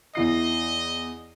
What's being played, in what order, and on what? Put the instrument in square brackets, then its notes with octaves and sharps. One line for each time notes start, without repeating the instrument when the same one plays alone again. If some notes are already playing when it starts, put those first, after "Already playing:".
[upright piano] E2 E4 C7 [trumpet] D#5